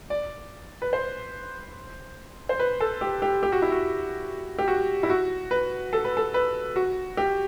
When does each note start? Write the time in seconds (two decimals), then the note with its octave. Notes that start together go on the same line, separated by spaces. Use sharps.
0.10 D5
0.82 B4
0.93 C5
2.49 C5
2.59 B4
2.80 A4
3.01 G4
3.22 G4
3.43 G4
3.52 F#4
3.62 E4
3.72 F#4
4.59 G4
4.68 F#4
5.03 E4
5.09 F#4
5.51 B4
5.93 A4
6.04 B4
6.17 A4
6.34 B4
6.76 F#4
7.17 G4